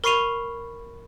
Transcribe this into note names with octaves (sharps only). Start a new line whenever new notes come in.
A#4 B5 C#6 C7 D#7 F7